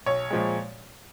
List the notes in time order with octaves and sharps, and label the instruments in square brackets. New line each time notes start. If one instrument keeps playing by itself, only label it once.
[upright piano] B1 C#5
A#2 F3 G#3